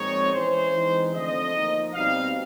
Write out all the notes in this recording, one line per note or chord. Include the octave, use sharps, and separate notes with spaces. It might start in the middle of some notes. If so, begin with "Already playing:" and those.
Already playing: A#2 F3 G#3 C4 D#4 C#5
E3 G#3 C#4 C5
E3 G#3 C4 D#4
D3 F3 A3 C4 D#5
F3 A#3 D#4
B2 G3 C4 D#4 F5